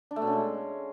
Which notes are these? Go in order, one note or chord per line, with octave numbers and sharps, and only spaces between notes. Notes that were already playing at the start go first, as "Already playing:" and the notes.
D4
A3
B2
C#4
G#3